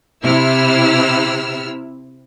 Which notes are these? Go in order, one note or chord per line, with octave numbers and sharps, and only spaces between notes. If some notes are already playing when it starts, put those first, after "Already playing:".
C3 E4 E6 F6